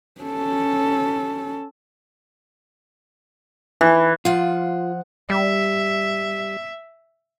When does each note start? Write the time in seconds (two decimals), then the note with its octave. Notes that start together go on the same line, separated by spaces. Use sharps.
0.21 C#4 A4
3.81 E3
4.25 F3 F4 F#5
5.30 G3 E5